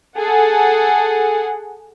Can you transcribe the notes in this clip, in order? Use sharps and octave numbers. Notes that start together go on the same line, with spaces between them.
G#4 A4 F#5